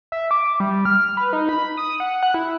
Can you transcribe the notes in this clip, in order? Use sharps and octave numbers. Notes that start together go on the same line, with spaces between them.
E5
D6
G3
F6
B4
D#4
B5
D#6
F#5
F#6
E4